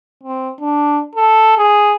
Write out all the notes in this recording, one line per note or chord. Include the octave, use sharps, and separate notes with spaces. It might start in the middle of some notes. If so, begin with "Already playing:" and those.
C4
D4
A4
G#4